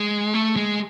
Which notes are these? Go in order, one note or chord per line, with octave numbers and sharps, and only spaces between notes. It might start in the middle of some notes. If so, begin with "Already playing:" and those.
Already playing: G#3
A3
G#3